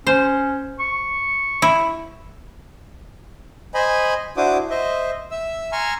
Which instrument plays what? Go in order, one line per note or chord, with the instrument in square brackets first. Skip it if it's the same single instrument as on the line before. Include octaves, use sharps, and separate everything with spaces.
[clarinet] C#4 [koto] C5
[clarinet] C#6
[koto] E4
[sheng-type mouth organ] C5 D#5 G#5 B5
D4 E4 F#4 C5 D6 D#6
C5 D#5 E5
E5 E6
G#5 A#5 C6 C#6 E6 F6